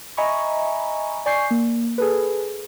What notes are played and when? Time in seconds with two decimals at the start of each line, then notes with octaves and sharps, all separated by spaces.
0.17 D#5 E5 G#5 A#5 B5 C#6
1.26 D5 G#5 C#6 G6 C7
1.51 A#3
1.98 G#4 A4 B4